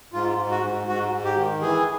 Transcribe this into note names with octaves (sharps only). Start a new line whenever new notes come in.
G#2 F4
G#2
F#4
G#2
G#2 F#4
G#2
G4
D#3
E3 G#4